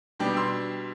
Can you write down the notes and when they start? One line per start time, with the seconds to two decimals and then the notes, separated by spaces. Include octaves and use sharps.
0.19 B2 G3 D4 G5
0.37 C6 E6